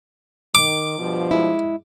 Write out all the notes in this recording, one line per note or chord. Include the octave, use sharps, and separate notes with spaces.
D#3 D6
G2 B2 F3
G#3 E4